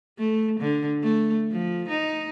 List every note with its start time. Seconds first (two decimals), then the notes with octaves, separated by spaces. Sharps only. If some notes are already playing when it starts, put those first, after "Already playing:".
0.18 A3
0.60 D3
1.04 A3
1.52 F3
1.89 D#4